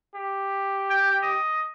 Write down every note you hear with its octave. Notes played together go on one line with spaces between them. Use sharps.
G4
G5
D#5